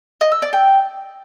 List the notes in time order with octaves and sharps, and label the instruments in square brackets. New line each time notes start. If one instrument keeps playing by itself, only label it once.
[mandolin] D#5
E6
D5
G5